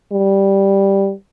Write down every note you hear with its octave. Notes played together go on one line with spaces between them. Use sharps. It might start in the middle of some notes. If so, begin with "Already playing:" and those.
G3